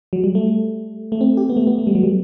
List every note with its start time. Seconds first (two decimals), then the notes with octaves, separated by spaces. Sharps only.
0.13 F#3
0.24 G3
0.35 A3
1.12 A3
1.21 C4
1.37 G4
1.49 B3
1.57 A3
1.67 B3
1.78 A3
1.87 G3
1.95 F#3
2.03 G3